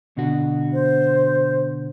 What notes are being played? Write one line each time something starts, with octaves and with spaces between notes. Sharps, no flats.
B2 D3 F#4
C5